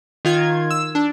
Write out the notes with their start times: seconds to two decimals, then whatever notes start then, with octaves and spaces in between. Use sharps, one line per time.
0.25 D#3 F4 G#6
0.71 E6
0.95 D4